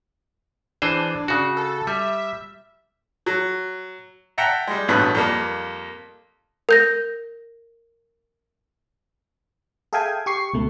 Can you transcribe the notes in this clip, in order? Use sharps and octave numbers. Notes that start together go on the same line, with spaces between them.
E3 D4 G#4 C5
C#3 F#4
A4
G3 E5
F#3
E5 F#5 G5 A5 A#5
G3 G#3
A1 G2 B2 B4 B5 F#6
F2 G3 A#3
A#4 G6 A#6
G#4 A4 E5 F5 G5 G#5
G4 C#6 C7
C#2 B2 A3